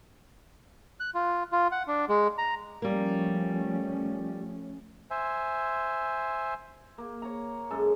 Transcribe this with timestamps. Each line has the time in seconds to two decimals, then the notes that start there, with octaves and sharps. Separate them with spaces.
1.00 F#6
1.14 F4
1.52 F4
1.72 F#5
1.87 D4
2.09 G#3
2.38 A#5
2.82 F3 G3 A3 A#3 C#4
5.10 C5 E5 G#5
6.98 A#3
7.22 C#5 A#5
7.70 F#2 G#3 A4